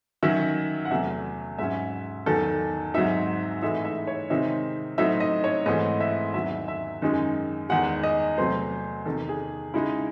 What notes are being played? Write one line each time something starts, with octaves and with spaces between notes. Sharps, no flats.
D#3 F#3 C#4 E5
F#5
E2 C3 F#3 A3 E5
G#2 F#3 C#4 E5
E2 D#3 F#3 A4
G#2 F#3 C4 D#4 E5
A2 E3 G#3 D#4 E5
E5
C#5
C3 D#3 G#3 C4 D#4 E5
A2 F#3 C4 D#4 E5
D#5
C#5
G#2 E3 A3 C4 D#5
E5
E2 D#3 F#3 E5
E5
F#2 D#3 G#3 D#4
E2 D#3 G#3 F#5
D#5
E2 C3 F#3 A3 C5
E2 C3 D#3 A4
G#4
C#3 G#3 D#4 E4